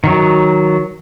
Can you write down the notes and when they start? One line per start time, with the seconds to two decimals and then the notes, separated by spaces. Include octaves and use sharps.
0.04 D#3 F#3